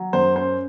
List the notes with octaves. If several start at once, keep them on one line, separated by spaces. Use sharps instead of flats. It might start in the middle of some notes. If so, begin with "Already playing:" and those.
Already playing: F#3
F#2 C5
C#4 C5